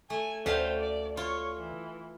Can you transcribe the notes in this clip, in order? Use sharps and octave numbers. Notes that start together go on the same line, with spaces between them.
A3 G#5
D2 A3 C#4 B4 C5 F5 G5
D5
F4 C#5
E3